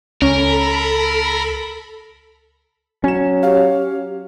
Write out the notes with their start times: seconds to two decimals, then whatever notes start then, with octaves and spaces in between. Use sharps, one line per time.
0.22 C#2 C#4 A4 A#4 B5
3.04 F#3 C#4 G#5 E7
3.43 G4 C#5 F5